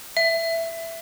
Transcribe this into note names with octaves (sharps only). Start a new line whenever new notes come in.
E5